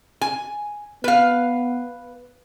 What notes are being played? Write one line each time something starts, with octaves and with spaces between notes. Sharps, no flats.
G#5
B3 B4 F5